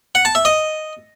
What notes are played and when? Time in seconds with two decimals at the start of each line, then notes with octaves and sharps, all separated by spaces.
0.15 F#5
0.25 A5
0.35 E5
0.45 D#5